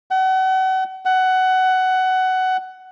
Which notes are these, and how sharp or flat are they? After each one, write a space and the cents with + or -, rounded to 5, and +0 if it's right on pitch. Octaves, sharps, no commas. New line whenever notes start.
F#5 +35
F#5 +15